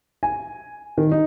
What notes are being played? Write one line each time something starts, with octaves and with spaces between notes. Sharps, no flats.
G#5
D#3
D#4